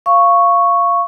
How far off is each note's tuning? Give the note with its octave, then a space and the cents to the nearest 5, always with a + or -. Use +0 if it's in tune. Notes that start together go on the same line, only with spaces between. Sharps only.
F5 -15 C#6 +0